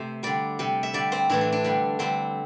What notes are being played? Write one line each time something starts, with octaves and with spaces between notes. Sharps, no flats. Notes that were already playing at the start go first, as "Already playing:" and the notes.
Already playing: C3 A3 A4 C5
D3 G3 D5
C3 G3
E5
D3 G3 D5
C4
A2 E3 A3 D4
D4
D4
D3 G3
D3 G3 C4